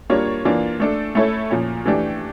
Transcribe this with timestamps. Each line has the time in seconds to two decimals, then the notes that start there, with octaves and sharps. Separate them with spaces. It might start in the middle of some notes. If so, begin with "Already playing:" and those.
0.10 G3 A#3 D4 F4 C#5
0.45 E3 A#3 D4 F4
0.80 A3 D4 A4
1.15 A3 C#4 E4 A4 C#5
1.51 A#2 F3 C#4
1.86 E3 A3 D4 G4